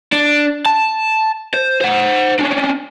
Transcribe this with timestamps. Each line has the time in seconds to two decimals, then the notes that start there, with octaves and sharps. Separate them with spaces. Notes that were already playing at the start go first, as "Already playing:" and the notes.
0.13 D4
0.66 A5
1.54 C5
1.81 C5 F#5
2.39 C#4 D4